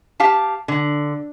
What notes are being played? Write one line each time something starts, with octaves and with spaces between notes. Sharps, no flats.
G4 F5 A5
D3